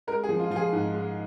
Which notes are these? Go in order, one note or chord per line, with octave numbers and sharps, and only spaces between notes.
G#3 A#4
G#4
F3
F4
F3 F4
G#4
G#2
G#3